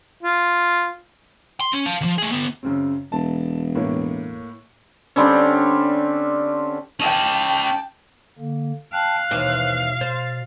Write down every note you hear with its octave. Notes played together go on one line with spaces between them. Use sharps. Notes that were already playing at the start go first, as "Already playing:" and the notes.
F4
C6
C#4
F5 A5
D2 F3
A3 G#4
D3 B3
F#2 C#3 C4
E1 A5
A2 A#3 C#5
D3 G3 C4 C#4
C#4 D#5 G5 A5
D3 A#3
F5 G5 A5 F#6
D#2 B2 E3 C4
C5 A6